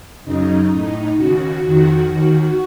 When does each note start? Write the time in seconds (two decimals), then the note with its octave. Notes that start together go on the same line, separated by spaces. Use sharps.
0.25 F#2 C#3 D#4
0.71 A2
1.17 D#2 C#3 F#4
1.62 F2 D#3 F#4
2.09 D#2 D#3 F#4